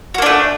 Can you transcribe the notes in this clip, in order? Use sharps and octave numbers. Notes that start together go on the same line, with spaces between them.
A3 A#3 D4 F#4